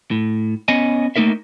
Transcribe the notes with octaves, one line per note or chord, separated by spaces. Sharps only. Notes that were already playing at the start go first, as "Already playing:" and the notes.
A2
B3 C#4 D#5 G#5
A3 A#3 D#4 A#4 E5